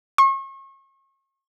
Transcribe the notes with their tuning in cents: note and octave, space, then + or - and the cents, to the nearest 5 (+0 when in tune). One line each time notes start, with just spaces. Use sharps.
C#6 -40